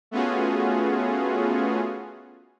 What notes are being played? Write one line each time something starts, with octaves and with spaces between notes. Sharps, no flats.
A3 B3 C#4 F4 F#4 G#4